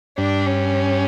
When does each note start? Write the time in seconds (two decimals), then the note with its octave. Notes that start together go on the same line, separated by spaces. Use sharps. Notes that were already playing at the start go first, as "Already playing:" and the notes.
0.18 G2 D4
0.46 C#4